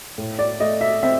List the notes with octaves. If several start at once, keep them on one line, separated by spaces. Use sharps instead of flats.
A2
D5
A3 D#5
E5
C4 E5